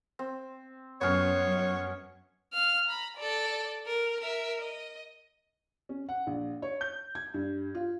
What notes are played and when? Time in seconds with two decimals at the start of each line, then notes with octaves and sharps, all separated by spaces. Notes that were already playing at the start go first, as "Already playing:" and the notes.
0.19 C4
1.01 F#2 B3 C#4 C#5
2.53 F5 F6
2.87 A#5 B5
3.17 A4 D5
3.87 A#4
4.20 A#4 E5
4.61 D#5
5.89 C#4
6.09 F#5
6.27 A#1
6.62 C#5
6.81 G6
7.15 G#6
7.34 G2
7.75 F4